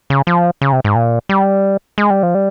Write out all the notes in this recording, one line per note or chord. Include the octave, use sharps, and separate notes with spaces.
C#3
F3
C#3
C3
G#2
A#2
G3
G#3
G3
F3
G3